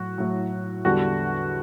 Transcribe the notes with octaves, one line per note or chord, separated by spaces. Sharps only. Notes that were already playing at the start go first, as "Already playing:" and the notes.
Already playing: A2 F#3 F#4
A2 F#3
E2 D3 G3 F#4